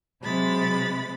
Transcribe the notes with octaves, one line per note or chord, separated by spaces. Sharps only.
C3 F#3 G#3 B5 A6